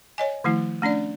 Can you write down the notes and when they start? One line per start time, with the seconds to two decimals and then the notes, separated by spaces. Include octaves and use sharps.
0.18 C#5 D#5 G#5
0.44 D#3 F3 A3 E4
0.82 A3 C#4 D4 D5